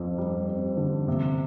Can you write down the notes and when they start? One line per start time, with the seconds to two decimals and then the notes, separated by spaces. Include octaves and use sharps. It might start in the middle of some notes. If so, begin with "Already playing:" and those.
Already playing: F2 C4
0.18 G3
0.48 C4
0.77 D3
1.08 C3